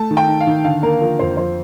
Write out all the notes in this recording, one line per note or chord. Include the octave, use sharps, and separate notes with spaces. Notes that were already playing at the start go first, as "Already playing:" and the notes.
Already playing: A3 A5
D#3
G5
D#4
F5
D#3
D3 F5
A#3 A#4
F3 A#4
F2 C5
F3 C5